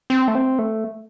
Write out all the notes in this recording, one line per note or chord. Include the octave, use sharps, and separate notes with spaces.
C4
A3
C4
A3